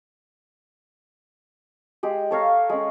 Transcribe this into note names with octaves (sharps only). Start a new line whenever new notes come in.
G#3 G4
A4 C#5 F5 A#5
G#3 C#4